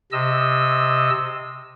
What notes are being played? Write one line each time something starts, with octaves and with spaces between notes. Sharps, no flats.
C3 D#5 E6